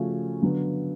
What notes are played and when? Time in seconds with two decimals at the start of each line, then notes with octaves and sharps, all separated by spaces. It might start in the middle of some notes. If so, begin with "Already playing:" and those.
Already playing: C#3 F3 A3 C#4 F#4
0.42 D3 F#3 B3